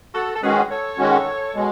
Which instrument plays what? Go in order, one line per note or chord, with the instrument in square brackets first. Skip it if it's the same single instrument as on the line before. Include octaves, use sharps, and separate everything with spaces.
[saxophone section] F#4 A4
A4
[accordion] D#3 G#3 C#4 F#4 [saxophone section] G#4 B4
[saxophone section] A4 C#5
[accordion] D#3 G#3 C#4 F#4
B2 G#3